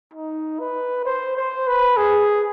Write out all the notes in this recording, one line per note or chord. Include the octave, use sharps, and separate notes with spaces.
D#4
B4
C5
C5
B4
G#4